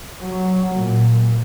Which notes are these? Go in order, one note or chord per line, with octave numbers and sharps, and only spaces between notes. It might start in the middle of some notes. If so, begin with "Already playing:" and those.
F#3
A#2